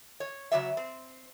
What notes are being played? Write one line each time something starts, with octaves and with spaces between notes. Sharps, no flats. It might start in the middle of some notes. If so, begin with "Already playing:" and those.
C#5
C#3 F#3 G3 E5
C4